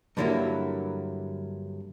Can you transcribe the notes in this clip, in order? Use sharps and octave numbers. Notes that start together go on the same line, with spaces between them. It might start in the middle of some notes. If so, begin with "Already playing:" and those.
G2 D3 F#3 A#3 E4